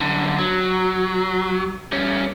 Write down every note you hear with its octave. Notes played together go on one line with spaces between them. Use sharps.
F#2 D3
F#3
G3 C#4